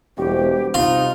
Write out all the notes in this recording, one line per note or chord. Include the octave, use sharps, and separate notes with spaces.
E1 G3 C4 F#4 G4
C3 D#4 F4